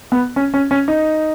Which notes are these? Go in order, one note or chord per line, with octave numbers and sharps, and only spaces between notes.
B3
C#4
C#4
C#4
D#4